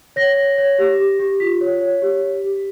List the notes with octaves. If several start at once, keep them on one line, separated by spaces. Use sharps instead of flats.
C#5 A#6
C#5
C#5
G4
G4
G4
F4 B6
C#5
C#5
G4
G4
G4